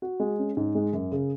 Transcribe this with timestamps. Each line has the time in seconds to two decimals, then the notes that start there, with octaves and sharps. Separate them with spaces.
0.02 F#4
0.20 G#3
0.39 C#4
0.57 G#2
0.75 G#3
0.93 F#2
1.12 C#3